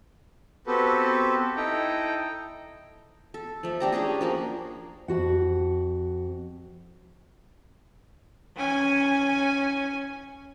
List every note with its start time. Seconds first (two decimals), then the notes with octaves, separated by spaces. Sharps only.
0.67 B3 C4 F#4 G4 A4 B4
1.56 D#4 E4 A4 D#5 G5 A#5
3.34 A4
3.63 F3 A3
3.80 D4 G4 A#5
3.92 C#4 D4 G4 G#4
4.21 F3 A#3 F#4
5.08 F2 F#4 F#5
8.56 C#4 G#5